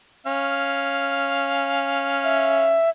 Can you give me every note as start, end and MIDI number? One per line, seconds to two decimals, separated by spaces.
0.26 2.78 61
0.26 2.78 77
2.24 2.90 76